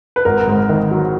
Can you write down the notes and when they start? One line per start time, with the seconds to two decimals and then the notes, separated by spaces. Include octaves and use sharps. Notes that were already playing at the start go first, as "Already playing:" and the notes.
0.16 B4
0.25 G#1 A#4
0.48 G#2
0.69 D#3
0.91 F#3